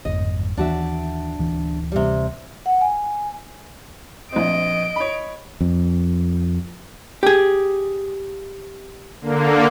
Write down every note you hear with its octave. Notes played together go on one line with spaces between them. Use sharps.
G1 F2 G#2 D#5
D#2 E3 D4 F#4 E5
D1 E3
C3 G3
F#5
G#5
A#1 C4 D#5 D7
C#5 B5
F2
G4 G#4
D3 A#3